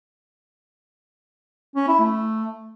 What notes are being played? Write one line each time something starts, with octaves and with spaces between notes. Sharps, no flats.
C#4
E4
A3